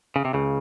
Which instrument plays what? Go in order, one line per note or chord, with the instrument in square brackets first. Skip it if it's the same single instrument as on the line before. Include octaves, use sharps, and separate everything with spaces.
[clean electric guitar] C#3
C3
C#2 C#3